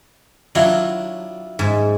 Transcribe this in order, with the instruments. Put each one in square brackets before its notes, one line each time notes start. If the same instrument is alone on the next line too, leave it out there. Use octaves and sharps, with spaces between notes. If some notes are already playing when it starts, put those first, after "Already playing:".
[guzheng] F#3 [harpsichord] D4 E4 F4
[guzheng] G#2